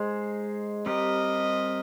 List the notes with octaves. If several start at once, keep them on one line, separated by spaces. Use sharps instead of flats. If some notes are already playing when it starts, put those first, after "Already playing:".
Already playing: G#3 D#4 G#4 C5
G3 C4 G4 A#4 D#5